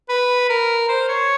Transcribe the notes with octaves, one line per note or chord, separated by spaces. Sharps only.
B4
A#4
C5
C#5